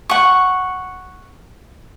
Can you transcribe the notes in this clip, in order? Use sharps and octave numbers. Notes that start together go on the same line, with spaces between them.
F#5 C#6